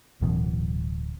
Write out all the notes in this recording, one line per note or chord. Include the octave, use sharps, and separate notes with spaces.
D1 F#2 B2 E3